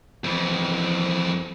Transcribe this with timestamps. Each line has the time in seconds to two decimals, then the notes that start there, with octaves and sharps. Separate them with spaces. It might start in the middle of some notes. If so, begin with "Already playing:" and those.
0.24 F2 E3